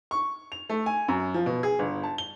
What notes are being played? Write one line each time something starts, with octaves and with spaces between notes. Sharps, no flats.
C#6
F7
A3
G#5
F#2
F3
B2
G#4
G1
A5
G7